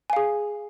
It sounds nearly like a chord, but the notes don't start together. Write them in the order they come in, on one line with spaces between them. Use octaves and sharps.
G#5 F5 G#4